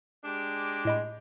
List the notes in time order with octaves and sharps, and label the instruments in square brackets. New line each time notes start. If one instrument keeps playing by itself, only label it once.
[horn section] G#3 D4 G4
[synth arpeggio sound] A2 D#5 B5